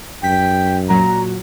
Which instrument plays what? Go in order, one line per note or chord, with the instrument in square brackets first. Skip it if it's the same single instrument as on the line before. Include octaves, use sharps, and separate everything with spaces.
[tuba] F#2 [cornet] G5 [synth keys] B6
[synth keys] A#2 F#3 [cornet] A#5